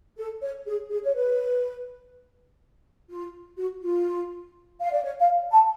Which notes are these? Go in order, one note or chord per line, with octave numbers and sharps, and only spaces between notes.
A4
C#5
G#4
G#4
C#5
B4
F4
F#4
F4
F5
D5
C#5
F5
A5